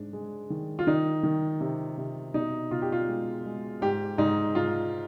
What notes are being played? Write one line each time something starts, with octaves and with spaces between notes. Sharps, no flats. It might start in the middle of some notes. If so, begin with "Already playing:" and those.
Already playing: G#2 G#3 D4
G#3
D#3
F4
D#3 D#4
D#3
C3
C3
B2 D#4
B2 F4
G4
F4
G#3
G#3
G#2 G4
G#2 D#4
G#2 F4